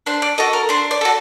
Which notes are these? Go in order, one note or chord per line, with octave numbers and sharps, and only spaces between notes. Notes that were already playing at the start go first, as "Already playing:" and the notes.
D4 C5
D5
F#4 A4 D#5
A#4
D4 C5
D5
F#4 A4